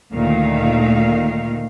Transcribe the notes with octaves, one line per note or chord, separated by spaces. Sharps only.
D2 A#2 D#3 A3 F5